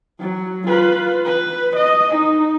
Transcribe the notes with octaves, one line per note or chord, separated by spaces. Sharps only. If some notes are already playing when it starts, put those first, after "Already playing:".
F#3
F4 B4
B4
D#5
D#4